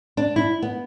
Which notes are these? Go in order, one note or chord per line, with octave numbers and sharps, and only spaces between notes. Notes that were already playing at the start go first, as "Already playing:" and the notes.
D4
E4
B3